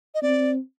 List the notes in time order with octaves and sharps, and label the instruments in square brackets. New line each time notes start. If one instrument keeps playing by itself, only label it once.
[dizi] D#5
[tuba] C4 [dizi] D5